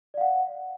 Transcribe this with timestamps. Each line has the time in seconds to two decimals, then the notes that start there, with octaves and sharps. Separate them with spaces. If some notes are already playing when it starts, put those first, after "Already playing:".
0.14 D5
0.17 F5
0.21 F#5